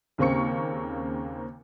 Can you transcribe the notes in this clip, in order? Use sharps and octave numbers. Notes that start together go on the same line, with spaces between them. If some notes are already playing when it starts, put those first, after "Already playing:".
D#2 C#3 A#3 C4 C#6 C#7